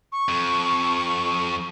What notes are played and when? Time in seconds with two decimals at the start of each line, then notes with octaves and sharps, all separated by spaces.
0.12 C#6
0.29 F2